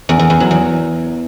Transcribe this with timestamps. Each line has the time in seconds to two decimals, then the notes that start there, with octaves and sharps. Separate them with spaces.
0.09 E2
0.19 E2
0.30 E2
0.40 F#3
0.51 E2